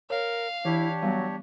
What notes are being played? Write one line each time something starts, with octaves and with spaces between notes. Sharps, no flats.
A#4 C#5 F5
E3 D4 E4 G4 C#5
F#3 G3 B3